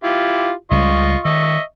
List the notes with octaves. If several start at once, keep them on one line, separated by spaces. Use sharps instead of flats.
E4 F4 G4
C#2 C#3 G3 F4 D#5 C#6
D#3 D#5 E5 C#6